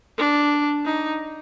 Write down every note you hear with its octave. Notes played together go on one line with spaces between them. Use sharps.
D4
D#4